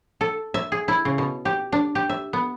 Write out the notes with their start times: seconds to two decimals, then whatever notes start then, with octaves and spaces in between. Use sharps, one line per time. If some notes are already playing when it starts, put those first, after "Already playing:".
0.21 A4
0.54 E5
0.72 G#4
0.88 E4
1.05 C#3
1.18 B2
1.45 G4
1.72 D4
1.95 G4
2.09 E5
2.33 B3